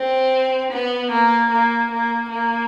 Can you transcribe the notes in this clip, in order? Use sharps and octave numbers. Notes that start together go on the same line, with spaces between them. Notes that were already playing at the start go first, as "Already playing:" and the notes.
Already playing: C4
B3
A#3
A#3
A#3
A#3